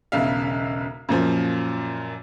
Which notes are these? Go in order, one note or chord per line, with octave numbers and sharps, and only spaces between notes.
E1 B1 C#3 E5 F5
F#2 A#2 F3